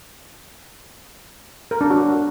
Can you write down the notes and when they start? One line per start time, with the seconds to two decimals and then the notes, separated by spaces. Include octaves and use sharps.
1.71 A#4
1.81 D4
1.90 F#4